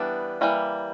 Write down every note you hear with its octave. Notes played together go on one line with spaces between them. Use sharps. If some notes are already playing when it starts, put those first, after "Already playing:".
Already playing: E3 G3 B3 D4
E3 G3 A#3